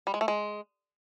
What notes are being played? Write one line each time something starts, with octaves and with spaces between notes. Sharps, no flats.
G3
G#3
A3
G#3